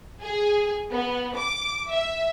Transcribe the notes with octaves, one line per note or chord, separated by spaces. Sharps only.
G#4
B3
D6
E5